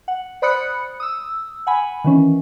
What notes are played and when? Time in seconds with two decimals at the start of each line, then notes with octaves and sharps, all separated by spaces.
0.08 F#5
0.42 C5 D5 B5 D#6 F#6 C#7
1.00 D#6 E6
1.67 F#5 G#5 B5
2.04 D#3 E3 C#4